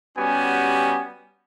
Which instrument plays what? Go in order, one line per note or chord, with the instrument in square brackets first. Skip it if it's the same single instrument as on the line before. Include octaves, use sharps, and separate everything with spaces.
[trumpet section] G3 B3 C#4 F#4 G4 G#5